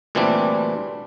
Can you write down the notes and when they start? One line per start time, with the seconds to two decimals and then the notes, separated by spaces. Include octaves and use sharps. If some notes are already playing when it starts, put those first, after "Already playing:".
0.15 D2 A#2 E3 G3 C4 D4